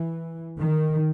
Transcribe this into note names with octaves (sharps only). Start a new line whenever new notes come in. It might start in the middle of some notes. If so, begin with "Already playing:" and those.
Already playing: E3
D#3